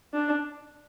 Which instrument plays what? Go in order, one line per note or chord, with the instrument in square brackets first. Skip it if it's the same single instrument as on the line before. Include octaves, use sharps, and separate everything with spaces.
[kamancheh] D4